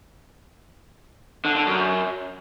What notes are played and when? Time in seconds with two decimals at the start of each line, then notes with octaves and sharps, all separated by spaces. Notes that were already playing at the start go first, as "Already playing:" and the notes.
1.45 D3
1.56 D3
1.67 F#2